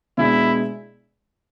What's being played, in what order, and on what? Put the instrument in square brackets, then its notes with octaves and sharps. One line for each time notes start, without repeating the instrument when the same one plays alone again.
[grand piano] B2 G#3 D4 [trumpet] E4